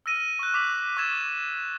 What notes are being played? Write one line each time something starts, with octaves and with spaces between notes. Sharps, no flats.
E6 F6 A#6 D#7
C#6 F#6
D6 B6 F7 F#7
C#6 D6 E6 G#6 A6 E7